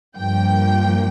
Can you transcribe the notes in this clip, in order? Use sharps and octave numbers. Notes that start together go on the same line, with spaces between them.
G2 F3 A#3 G5